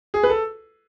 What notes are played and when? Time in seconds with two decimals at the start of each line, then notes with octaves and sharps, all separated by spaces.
0.14 G#4
0.23 B4
0.30 A4